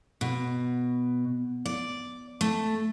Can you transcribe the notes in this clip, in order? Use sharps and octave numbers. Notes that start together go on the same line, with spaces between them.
B2
D5
A3